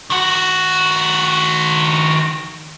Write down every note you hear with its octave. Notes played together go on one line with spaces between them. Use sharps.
D#3 F#4